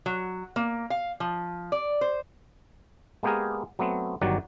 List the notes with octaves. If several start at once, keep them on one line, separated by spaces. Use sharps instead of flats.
F#3
A#3
F5
F3
D5
C5
G#3 A#3 B3 G4 G#4 A#4
F#3 A3 B3 C4
G1 D#3 F#3 F#4 G4 D5